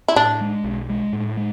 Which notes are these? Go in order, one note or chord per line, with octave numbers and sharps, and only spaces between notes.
E4
A2 D4
G#3
B1
G#3
A2
G#3